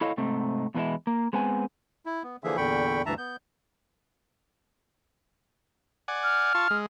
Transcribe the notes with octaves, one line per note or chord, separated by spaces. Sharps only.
E4 A4 C#5 D#5 F5
G#2 C3 A3 C4 D#4
E2 B2 E3 F#3 G#3 E4
A#3
G#3 B3 C4 G#5
E4
B3
D3 E3 F3 A#3 G#4 E5
E2 A#2 D3 G5 B5 C#6
D2 G2 E3 E5 A5 A#5
B3 G6
D5 F#5 G#5
F6
F4 A5 C#6
G#3